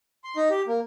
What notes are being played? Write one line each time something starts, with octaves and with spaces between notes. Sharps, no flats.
C6
D#4
G4
A#3